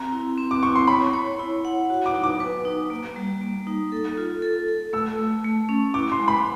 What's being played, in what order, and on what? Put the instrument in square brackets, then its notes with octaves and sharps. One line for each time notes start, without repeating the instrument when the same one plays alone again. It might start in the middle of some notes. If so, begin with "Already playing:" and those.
Already playing: [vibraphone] C4 [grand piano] A#5
[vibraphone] E4
C4
[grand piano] D6
[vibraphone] E4 [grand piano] C#6
[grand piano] C6
[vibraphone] C#5 [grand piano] B5
[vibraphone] C#5
E4
F#5
F#4
[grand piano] D6
[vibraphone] D#4
[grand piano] D6
[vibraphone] B4
D#4
A#3
G3
A#3
D#4
A4
F4
A4
A4
[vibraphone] A3 [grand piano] E6
[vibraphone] A3
A3
C#4
[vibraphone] E4 [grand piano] D6
[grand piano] C6
[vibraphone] G#3
[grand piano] B5